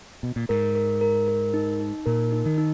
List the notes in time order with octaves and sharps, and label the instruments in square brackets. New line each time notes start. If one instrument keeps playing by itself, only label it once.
[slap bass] B2
A#2
[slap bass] G#2 [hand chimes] A#4
[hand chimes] A#4
A#4
A#4
D#4
D#4
[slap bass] A#2 [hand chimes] A#4
[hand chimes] D#4
[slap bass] D#3
[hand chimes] D#4